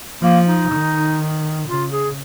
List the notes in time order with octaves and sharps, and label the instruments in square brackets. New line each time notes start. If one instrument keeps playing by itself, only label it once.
[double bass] F3 [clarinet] A#3
[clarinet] D#4
[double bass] D#3
[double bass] C#3 [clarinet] F4
[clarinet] G#4